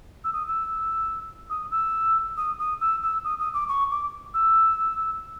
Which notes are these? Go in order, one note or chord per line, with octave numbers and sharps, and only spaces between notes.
E6
D#6
E6
D#6
E6
D#6
D#6
E6
E6
D#6
D#6
D6
C#6
D6
E6